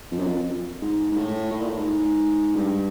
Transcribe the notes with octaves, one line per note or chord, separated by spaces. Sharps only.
F2
F#2
F2
G#2
G#2
A2
A2
A#2
A2
G#2
G2